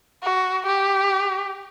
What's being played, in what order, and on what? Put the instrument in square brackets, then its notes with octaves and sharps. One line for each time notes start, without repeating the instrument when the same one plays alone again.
[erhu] F#4
G4